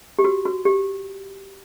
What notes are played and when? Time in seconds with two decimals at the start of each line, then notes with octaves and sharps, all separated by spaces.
0.19 G4
0.24 F#4
0.45 F#4
0.65 G4